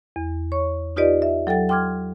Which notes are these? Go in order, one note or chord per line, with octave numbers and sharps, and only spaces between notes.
E2
C#5 C#6
D#4 F4 G4 B4 D5 D#5
E5
F#3 A4 G5 A6
G5 C6 D6 F6 G#6